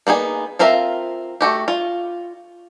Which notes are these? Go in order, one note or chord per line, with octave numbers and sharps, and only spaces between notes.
A#3 B3 D#4 G#4
C4 F4 A#4 E5 F5
A3 F#4 G4
F4